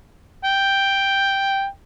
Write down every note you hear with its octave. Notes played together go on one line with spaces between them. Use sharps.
G5